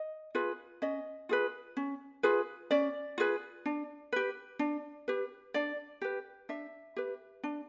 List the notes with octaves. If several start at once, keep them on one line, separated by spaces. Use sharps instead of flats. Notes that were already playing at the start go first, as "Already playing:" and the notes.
Already playing: D#5
F4 G#4 B4
C#4 D#5
F4 G#4 B4
C#4
F4 G#4 B4
C#4 D5
F4 G#4 B4
D4
G4 B4
D4
G4 B4
D4 D5
G4 B4
D4 E5
G4 B4
D4